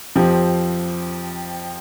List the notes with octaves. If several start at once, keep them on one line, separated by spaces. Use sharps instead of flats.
F2 F3 C4 G4